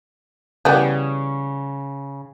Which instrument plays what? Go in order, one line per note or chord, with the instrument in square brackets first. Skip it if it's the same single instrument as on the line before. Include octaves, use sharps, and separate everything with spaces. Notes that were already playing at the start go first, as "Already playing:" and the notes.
[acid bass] C#3 [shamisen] E3 G3 B3